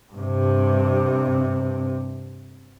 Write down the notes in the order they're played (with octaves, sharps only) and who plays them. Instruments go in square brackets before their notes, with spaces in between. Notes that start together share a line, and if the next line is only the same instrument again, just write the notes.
[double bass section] G2 C3